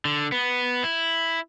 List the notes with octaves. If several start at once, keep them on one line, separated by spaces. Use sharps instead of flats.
D3
B3
E4